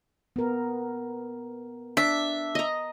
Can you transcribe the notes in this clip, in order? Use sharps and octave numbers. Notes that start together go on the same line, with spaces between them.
B3 A#4
D4 E5
D#5 A#5